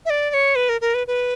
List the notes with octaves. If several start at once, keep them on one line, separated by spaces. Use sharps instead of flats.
E5
D5
D5
C#5
B4
A#4
A#4
B4
B4